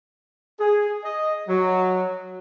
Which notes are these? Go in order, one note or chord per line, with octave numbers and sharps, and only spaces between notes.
G#4
D#5
F#3